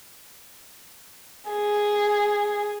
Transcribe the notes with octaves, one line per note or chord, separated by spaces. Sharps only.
G#4